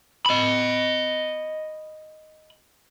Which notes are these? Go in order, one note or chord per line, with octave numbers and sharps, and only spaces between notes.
D#5 B5